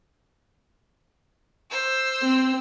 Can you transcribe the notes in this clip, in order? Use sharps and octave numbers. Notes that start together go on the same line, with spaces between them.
C5 E6
C4